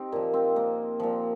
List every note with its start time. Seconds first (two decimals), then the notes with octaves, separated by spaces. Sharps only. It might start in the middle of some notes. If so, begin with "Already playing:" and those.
Already playing: C4 D#4 G4
0.12 A#2 F3 A#3
0.34 C4
0.56 A#3
1.00 A#2 F3